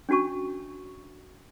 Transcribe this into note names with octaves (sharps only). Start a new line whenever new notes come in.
C#4 D4 F#4 A5 C#6